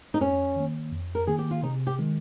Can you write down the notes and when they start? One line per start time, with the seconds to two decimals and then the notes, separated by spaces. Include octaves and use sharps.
0.14 D#4
0.20 F2 C#4
0.56 D#3 A#3
0.92 F2
1.15 A#4
1.27 D#3 A#3 G#4
1.38 G4
1.51 F4
1.63 C3 D#4
1.87 G4
1.99 D#3 G#3